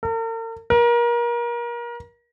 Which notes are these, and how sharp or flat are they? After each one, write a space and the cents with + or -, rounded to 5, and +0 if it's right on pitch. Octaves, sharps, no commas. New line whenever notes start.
A#4 -45
A#4 +30